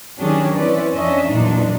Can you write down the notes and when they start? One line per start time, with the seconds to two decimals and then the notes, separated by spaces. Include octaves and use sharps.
0.19 D#3 F#3 C#4 D4 G4 G#4
0.55 E3 C4 C#4 E4 B4 D5
0.94 F2 C#4 D4 D#5 E5
1.27 E2 A#2 E3 F#3 D4 D#4